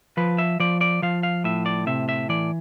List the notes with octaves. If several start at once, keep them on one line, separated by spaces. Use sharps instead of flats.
F3 B4
E5
F3 D5
D5
F3 F5
F5
A2 E5
D5
C3 E5
E5
E3 D5